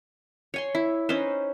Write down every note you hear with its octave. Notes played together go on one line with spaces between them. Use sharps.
C#5 G#5 C6
E4
C#4 D#4 B4 C5